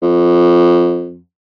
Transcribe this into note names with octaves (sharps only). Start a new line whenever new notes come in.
F2